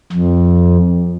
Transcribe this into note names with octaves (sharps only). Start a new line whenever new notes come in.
F2